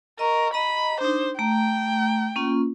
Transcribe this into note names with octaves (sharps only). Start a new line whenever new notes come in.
A#4 D#5 C#6
D#5 A#5 B5
D4 D#4 C5
A3 G5 A#5
A#3 C#4 F4